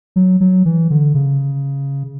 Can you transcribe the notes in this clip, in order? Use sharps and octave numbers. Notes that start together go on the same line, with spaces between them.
F#3
F#3
E3
D3
C#3